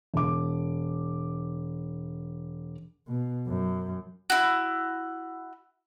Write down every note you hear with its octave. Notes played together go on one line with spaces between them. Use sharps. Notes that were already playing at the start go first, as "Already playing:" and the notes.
E1 D6
B2
F#2
E4 F#4